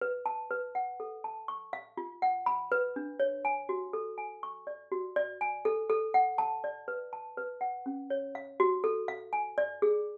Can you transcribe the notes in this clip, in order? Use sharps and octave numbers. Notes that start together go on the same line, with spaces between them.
B4
A5
B4
F#5
A4
A5
C#6
F5
F4
F#5
B5
B4
D4
C#5
G#5
F#4
A4
G#5
C#6
D5
F#4
D5
G#5
A4
A4
F#5
A5
D5
B4
A5
B4
F#5
C#4
C#5
F5
F#4
A4
F5
G#5
D5
G#4